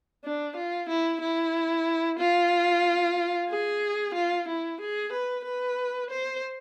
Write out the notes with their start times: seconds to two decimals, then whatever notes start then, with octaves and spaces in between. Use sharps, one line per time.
0.24 D4
0.56 F4
0.89 E4
1.21 E4
2.19 F4
3.50 G#4
4.14 F4
4.48 E4
4.81 G#4
5.12 B4
5.45 B4
6.10 C5